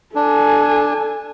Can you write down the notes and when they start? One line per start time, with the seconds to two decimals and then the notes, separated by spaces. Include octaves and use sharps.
0.16 D4 A4 G#5